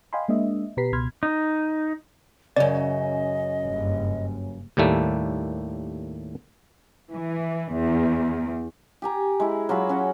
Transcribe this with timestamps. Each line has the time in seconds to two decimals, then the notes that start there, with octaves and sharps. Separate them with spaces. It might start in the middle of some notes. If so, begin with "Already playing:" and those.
0.13 D#5 F5 G5 G#5 B5 C6
0.29 G#3 A#3 D4 D#5 E5
0.77 B2 G4 B4 A#5 B6 C7
0.93 C#2 B2 B5 C6 F6 G#6
1.23 D#4
2.56 F#2 C#3 D5 D#5
3.65 F#1 G2
4.77 D#2 A2 G3 A3 A#3
7.14 E3
7.72 E2
9.02 G4 G#5 A#5
9.40 G#3 E4
9.69 F#3 F4 G#4 B5
9.89 C#4 F#4 F#5